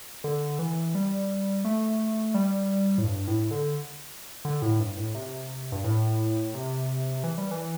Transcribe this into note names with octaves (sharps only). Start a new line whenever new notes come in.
D3
E3
G3
A3
G3
A2
G2
A2
D3
D3
A2
G2
A2
C3
G2
A2
C3
E3
G3
E3